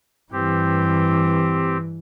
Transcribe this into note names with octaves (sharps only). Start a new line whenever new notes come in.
G2 E3 C4 G4